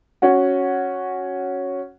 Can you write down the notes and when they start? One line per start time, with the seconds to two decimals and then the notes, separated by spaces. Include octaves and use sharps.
0.22 C#4 F#4 F#5